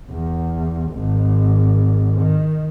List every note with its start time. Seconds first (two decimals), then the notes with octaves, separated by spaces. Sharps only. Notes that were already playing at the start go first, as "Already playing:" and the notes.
0.10 E2
0.92 G#1
2.22 D#3